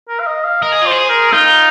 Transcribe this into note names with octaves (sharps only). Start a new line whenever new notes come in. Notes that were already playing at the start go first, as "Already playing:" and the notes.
A#4
F5
D#5
F5
A#4 D#5
G#4
F4 C5
G#4
A#4
D#4 F4